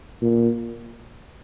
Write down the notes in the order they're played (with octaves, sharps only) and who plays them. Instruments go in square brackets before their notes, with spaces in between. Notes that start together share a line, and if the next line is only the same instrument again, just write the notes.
[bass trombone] A#2